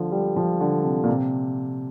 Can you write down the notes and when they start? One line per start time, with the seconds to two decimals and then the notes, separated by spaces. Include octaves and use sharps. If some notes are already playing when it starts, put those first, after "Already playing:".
Already playing: D3 F3
0.12 G3
0.36 F3
0.61 D3
0.84 C3
1.04 A#2
1.09 C3